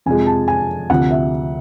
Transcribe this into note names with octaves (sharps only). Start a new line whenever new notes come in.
F2 C3 F3 G#3 G#5
A5
G#5
D2 C3 F3 F#5
E5